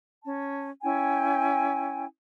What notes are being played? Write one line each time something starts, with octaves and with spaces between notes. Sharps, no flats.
C#4 A5
C#4 E4 G5 G#5